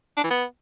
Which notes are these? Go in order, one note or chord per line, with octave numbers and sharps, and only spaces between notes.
D4
E3
B3